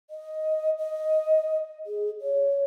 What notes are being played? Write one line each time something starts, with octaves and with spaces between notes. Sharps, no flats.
D#5
D#5
G#4
C#5